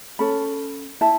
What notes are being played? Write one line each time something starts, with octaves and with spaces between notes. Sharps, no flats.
C#4 A4 B5
E4 A5